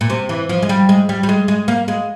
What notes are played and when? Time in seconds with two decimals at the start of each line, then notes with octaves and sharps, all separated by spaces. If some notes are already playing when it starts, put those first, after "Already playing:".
0.01 A#2
0.10 C3
0.29 E3
0.49 F3
0.63 G#3
0.69 G3
0.89 G#3
1.09 G3
1.23 G3
1.29 G#3
1.48 G#3
1.68 A#3
1.88 G#3